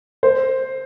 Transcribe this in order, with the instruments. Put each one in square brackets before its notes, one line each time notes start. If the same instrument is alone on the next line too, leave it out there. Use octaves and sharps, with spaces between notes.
[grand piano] C5